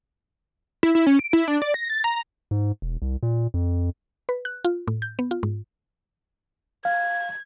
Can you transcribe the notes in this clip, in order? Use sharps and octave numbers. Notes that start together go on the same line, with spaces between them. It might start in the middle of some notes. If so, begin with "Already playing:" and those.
E4
E4
C#4
D7
E4
D4
D5
A#6
A6
A#5
G#2
E1
C2
A#2
F2
B4
F#6
F4
A2
G6
B3
F4
G#2
F5 G#6